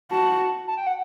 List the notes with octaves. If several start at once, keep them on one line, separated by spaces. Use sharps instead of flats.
F#4 A5
A5
G5
F#5